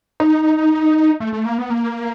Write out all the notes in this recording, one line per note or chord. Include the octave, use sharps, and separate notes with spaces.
D#4
A3
A3
A#3
B3
A#3